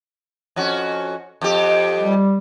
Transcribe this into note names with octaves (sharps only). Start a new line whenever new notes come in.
F2 C#4 F#4
F2 G4
G3